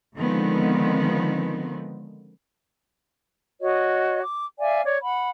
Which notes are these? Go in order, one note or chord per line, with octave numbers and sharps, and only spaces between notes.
D3 D#3 F3 G#3 B3 C4
F#4 C#5 D#5
D6
D5 E5 F5 G#5
C#5 D5
F#5 B5